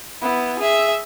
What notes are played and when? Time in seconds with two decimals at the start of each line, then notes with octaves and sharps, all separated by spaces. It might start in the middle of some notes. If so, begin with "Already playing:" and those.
0.22 B3 E4
0.59 G#4 E5